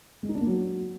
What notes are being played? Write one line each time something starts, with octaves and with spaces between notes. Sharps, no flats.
G#3
D#4
D4
A#3
F#3